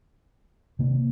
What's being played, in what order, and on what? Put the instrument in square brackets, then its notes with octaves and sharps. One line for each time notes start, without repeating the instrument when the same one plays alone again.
[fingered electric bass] C3 D#3 A#3